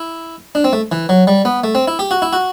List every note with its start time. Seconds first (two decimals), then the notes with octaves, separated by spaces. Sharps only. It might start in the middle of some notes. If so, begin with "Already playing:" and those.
Already playing: E4
0.55 D4
0.64 C4
0.73 A3
0.92 E3
1.09 F#3
1.27 G3
1.45 B3
1.64 A3
1.75 C4
1.88 E4
1.99 G4
2.11 F#4
2.22 E4
2.33 F#4